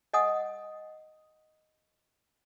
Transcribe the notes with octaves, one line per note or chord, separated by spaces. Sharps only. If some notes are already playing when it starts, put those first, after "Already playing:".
D#5 F#5 G#5 D#6